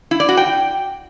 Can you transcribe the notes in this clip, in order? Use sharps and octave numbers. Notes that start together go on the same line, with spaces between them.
E4
D5
F#4
G5